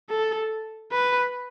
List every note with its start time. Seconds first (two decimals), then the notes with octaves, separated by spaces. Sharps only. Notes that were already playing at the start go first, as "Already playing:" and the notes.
0.10 A4
0.92 B4